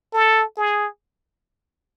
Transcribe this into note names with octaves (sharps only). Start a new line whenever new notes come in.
A4
G#4